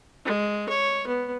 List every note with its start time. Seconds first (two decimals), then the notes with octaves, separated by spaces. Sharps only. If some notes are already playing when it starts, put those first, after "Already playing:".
0.25 G#3
0.69 C#5
1.07 B3